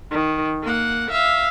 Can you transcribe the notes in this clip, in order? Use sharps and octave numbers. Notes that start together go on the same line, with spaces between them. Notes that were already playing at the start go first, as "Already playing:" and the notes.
D#3
A#3 F#5
E5 F5